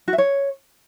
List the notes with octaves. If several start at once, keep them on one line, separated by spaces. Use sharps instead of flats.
F#4
E5
C#5